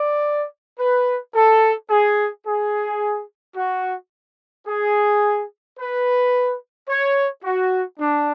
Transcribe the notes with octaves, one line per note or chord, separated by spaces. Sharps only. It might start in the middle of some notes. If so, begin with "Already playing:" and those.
Already playing: D5
B4
A4
G#4
G#4
F#4
G#4
B4
C#5
F#4
D4